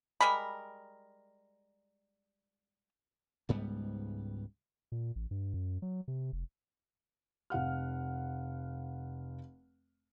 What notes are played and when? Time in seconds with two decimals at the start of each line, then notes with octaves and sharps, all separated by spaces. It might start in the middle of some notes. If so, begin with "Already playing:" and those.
0.21 G3 G#3 A#4 B5
3.49 C#2 G#2 G3 B3
4.92 A#2
5.16 A1
5.31 G2
5.54 F#2
5.82 F#3
6.08 C3
6.32 F1
7.50 F1 F5 F#5 F6